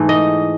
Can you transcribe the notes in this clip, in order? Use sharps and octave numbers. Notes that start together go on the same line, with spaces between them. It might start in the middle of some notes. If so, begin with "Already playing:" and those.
Already playing: G#2 E3 A3
D#5